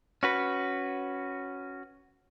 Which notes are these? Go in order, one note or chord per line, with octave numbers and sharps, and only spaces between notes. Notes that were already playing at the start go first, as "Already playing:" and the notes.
C#4 F#4 B4